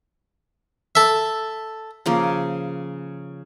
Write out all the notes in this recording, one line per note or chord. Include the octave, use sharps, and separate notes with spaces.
A4 E5
C#3 F3 A#3